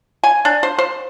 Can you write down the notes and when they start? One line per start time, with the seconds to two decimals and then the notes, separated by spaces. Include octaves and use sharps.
0.24 G#5
0.45 D4
0.63 C5
0.78 C5